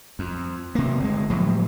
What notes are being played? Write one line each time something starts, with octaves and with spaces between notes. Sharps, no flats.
F2
C3 A#3
G1 G#3
A2 F3 F#3